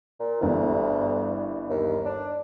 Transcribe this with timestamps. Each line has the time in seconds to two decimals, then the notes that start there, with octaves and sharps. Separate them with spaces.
0.20 A#2
0.41 G1 D2 G2 E3
1.70 D#2
2.05 D4